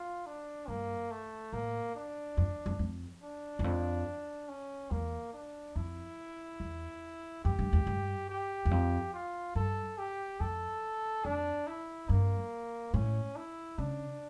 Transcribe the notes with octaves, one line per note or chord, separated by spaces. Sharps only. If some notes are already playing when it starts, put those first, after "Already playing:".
Already playing: F4
D4
G2 A#3
A3
A2 A#3
D4
F2
F2
F2
D4
E2
F2
C#4
E2 A#3
D4
F2 E4
E2
F2 G4
G2
E2
G2
G4
E2
F2
F4
G2 A4
G4
F2 A4
F2 D4
E4
G2 A#3
A2 C#4
E4
C#3 D4